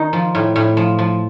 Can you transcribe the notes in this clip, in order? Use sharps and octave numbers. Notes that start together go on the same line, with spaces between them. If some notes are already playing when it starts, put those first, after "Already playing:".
Already playing: D#3 D#4
F3
A2
A2
F3
F3